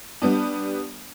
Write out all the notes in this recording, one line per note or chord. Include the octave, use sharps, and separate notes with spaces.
G3 B3 D4